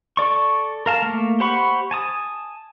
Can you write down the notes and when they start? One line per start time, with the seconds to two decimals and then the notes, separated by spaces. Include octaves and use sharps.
0.17 A4 D5 C#6
0.86 A#4 F5 A5
1.02 A3 A#3
1.40 G4 C5 F#5 B5 C#6
1.91 G#5 A5 D#6